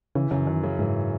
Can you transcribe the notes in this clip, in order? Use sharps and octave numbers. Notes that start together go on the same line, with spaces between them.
C#3 E3
F#2 C#3
F#2 D#3
C#3
G#2 E3